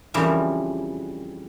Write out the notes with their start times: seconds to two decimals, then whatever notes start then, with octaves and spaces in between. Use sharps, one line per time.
0.14 F2 C#3 E3 G3 A#4